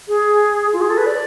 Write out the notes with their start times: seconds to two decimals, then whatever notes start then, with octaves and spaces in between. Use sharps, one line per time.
0.08 G#4
0.73 F4
0.82 G#4
0.90 A4
0.98 B4
1.06 D5